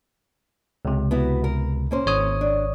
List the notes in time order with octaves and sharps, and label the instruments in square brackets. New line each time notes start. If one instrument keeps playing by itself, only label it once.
[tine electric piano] C#2 C3
[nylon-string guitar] B3 E4 F#4
A#4
A#3 C#4 C5
[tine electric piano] G#1 C#5 D#6
[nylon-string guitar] D4